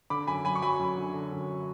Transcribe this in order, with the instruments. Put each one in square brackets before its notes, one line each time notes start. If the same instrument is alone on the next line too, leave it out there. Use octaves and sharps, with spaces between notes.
[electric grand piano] D3 [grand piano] B5 D6
[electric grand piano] F#2 [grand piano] G#5 B5
[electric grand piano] F#3 [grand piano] G#5 B5
[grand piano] C#6
[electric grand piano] F#3 [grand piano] G#5 B5
[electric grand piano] F#2
D3
D3
F#2